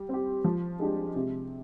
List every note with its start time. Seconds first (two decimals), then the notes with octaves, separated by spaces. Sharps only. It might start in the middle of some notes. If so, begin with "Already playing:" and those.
Already playing: G3
0.09 C4 G4
0.44 F3
0.79 G#3 D4 G4
1.16 C3